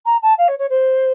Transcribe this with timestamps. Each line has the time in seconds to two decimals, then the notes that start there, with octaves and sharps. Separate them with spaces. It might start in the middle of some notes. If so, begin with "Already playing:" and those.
0.05 A#5
0.22 A5
0.38 F5
0.48 C#5
0.58 C#5
0.69 C5